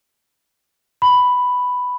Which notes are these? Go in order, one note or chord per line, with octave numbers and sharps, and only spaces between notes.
B5